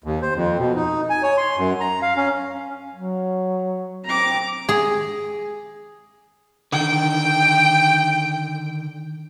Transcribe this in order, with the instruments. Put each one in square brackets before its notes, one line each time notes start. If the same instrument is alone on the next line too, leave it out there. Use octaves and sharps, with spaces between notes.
[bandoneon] D#2
C5
F2
B2
D#4
G#5
C#5
C6
F#2
A#5
F5
C#4
[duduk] F#3
[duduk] C4 [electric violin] A#5 D6
[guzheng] G#4
[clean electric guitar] D3 D#3 [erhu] G5